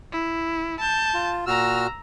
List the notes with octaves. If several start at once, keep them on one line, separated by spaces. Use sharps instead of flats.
E4
A5 G6
F4
A#2 F#4 A#5 E6 F6